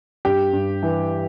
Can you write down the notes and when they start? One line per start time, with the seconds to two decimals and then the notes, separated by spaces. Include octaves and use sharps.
0.25 G2 G4
0.53 G2
0.83 E3